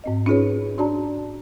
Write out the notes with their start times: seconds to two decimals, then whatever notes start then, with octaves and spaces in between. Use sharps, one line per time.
0.04 G#2 C4 D#5
0.26 C#4 D#4 F4 G#4 B4 C#5
0.78 D4 F#4 D5 A5 A#5